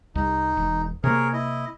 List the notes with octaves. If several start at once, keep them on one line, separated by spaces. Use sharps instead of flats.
C2 D#4
E1
C3 A#3 G#4 A#4 C#5
E4 D#5